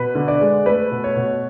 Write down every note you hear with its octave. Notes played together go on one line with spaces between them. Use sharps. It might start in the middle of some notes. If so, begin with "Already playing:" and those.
Already playing: B2 B4
D3
D5
G#3
A3 B4
B2
C#5
B2